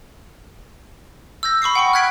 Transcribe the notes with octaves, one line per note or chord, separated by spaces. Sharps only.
E6 G6 A#6
B5 C#6 D#6 C7
F#5 G5 B5 C#6
F6 F#6 G#6 B6 D7